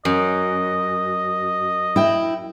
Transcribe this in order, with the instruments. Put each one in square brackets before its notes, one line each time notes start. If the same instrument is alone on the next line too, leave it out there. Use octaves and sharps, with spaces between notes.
[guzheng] F#2 [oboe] D#5
[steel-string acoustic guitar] E4 G5